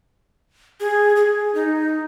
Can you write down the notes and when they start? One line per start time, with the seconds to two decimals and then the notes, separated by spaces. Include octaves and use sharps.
0.80 G#4
1.16 G#4
1.55 D#4